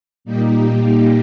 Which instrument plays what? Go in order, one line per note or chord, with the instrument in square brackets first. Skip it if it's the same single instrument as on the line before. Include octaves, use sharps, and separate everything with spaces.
[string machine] A#2 G3 A#3 D#4 G4